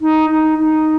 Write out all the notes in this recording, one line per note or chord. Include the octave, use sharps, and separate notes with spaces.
D#4
D#4
D#4